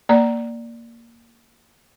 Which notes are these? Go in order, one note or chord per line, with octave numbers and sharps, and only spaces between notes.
A#3 D5 A#5